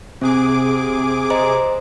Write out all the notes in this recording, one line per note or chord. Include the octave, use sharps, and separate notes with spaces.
C3 C4 G#4 D6
C5 D#5 A#5